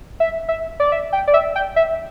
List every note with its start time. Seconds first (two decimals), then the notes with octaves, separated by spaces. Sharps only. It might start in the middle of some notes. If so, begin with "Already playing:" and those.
0.20 E5
0.48 E5
0.80 D5
0.92 E5
1.13 G5
1.27 D5
1.34 E5
1.56 G5
1.76 E5